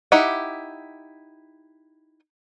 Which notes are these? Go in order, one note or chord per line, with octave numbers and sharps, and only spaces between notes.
D#4 E4 G4 F#5